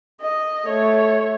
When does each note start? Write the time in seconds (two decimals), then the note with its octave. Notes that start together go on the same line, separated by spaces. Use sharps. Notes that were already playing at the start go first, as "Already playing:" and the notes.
0.21 D#5
0.67 A3 C#5